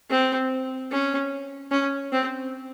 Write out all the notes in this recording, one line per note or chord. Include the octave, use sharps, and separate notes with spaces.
C4
C#4
C#4
C4